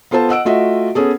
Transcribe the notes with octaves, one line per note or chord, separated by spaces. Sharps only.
B3 F4 A4 C5 A5
D#5 F#5 E6 D7
A3 F4 F#4 D#5 E5
B3 C#4 G#4 A4